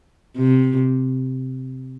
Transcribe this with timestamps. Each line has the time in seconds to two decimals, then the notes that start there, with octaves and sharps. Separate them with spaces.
0.37 C3